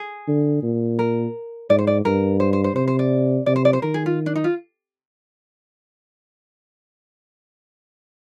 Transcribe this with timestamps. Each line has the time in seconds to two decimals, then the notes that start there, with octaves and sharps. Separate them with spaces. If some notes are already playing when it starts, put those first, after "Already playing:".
Already playing: G#4
0.28 D3
0.63 A#2
0.99 A#4
1.69 G#2 D5
1.78 C5
1.87 D5
2.05 G2 A#4
2.40 C5
2.53 C5
2.64 C5
2.75 C3 C5
2.88 C5
2.99 D5
3.46 C3 D5
3.56 C5
3.65 D5
3.73 C5
3.82 D#3 A#4
3.94 G#4
4.06 F4
4.26 D4
4.35 D#4
4.44 F4